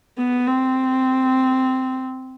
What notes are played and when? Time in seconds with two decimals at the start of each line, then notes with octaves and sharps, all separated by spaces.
0.18 B3
0.47 C4